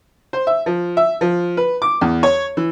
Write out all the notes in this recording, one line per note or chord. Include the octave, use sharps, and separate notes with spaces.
C5
E5
F3
E5
F3
B4
D6
E2
C#5
E3